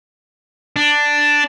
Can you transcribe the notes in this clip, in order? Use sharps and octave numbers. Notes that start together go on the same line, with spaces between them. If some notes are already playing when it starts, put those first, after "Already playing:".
D4